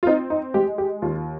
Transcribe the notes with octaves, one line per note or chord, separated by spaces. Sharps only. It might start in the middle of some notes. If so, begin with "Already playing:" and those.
F4
C4 D#4
D#4
G#3 G4
G4
D#2 F4